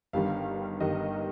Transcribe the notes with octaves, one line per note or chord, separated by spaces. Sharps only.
G1 G2 D#3 G3 F5
G1 G2 D#3 G3 D#5